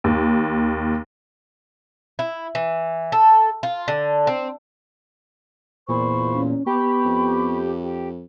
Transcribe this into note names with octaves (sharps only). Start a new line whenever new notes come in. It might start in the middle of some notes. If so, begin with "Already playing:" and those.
D#2
E4
E3
A4
F4
D3
C4
E2 A#2 C5 B5 C#6
C#4
B3 G4 B5 C#6
F2
G4